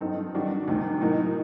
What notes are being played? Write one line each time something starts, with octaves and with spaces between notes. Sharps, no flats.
G2 F#3 C4 D#4 A4
D#3 G3 D4 F#4
D2 C3 D#3
A2 F#3 A#3 D#4